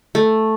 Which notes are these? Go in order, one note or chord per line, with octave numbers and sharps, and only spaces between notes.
A3